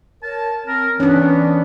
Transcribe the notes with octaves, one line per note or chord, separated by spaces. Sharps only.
A#4 C#5 A5
C4 A#4
E3 B3 C#4 D4